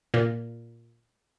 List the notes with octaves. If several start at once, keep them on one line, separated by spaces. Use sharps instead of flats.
A#2